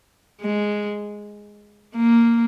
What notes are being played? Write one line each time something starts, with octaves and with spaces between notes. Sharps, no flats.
G#3
A#3